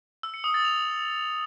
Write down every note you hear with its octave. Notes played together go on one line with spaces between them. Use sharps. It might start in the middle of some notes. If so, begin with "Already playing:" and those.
E6
C#7
D#6
A6
F7